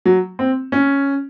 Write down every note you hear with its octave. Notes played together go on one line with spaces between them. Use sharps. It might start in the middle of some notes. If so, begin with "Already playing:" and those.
F#3
C4
C#4